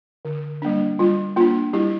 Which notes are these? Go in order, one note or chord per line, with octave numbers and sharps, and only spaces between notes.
D3
G3 A#3 D4
G3 F4
A#3 D4 F4
G3 E4 G4